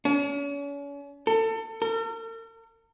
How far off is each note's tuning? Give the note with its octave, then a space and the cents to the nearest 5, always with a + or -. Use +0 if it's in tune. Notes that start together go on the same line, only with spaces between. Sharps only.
C#4 +40
A4 +30
A#4 -45